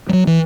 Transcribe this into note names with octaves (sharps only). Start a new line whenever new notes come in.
G3
F#3
E3